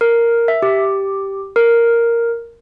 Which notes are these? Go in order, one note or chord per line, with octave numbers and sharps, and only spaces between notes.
A#4
E5
G4
A#4